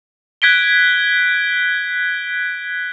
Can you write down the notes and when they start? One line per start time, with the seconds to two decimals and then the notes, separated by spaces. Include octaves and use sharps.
0.42 F#6 G#6 B6 D7 G7